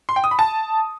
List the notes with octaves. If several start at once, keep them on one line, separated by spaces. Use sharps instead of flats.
C6
G5
D#6
B5
A5